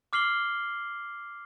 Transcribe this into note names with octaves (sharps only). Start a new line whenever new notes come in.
D6 F6 C7 F#7 G7